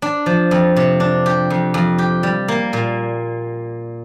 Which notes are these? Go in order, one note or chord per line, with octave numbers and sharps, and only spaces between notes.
D4
F3
F2
C3
D4
G4
F2
F2
G4
G3
A#3
A#2